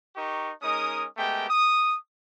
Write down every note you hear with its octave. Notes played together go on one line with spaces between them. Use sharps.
D#4 G4 A#4 C#6
G#3 C#4 D#4 A#4 D#6
G#3 A3 B3 G4 A#4 G5
D#6